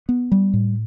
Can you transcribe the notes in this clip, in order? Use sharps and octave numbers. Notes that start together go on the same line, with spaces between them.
B3
G3
A2